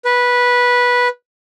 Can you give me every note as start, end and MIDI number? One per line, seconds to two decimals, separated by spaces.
0.05 1.08 71